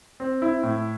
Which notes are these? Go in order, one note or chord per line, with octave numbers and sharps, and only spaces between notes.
C4
E4
A2